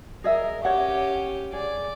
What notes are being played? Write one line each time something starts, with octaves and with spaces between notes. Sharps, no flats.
G#4 A#4 D#5 E5
C#4 G4 C#5 F#5
G#4 D5